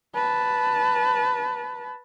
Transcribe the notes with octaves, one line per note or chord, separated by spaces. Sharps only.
B4 A5